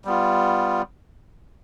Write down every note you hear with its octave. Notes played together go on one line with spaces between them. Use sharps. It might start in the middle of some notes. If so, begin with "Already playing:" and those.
G3 B3 F4